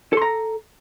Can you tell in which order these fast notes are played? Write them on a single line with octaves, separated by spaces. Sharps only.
A4 C6 A#5